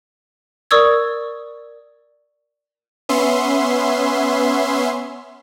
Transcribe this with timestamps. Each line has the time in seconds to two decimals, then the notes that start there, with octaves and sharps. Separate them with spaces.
0.71 A#4 D5 C#6 D#6 E6 G#6
3.09 B3 C#4 E5 C6